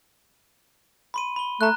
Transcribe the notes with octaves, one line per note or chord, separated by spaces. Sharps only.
B5 C6 D#7
B5 G7
A3 A#5 F#6